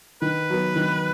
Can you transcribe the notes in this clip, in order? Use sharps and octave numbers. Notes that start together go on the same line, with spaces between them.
D#3 B4
F#3 B3
D#3